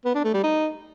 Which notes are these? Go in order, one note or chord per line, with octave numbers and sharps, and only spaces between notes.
B3
D4
A3
G3
D#4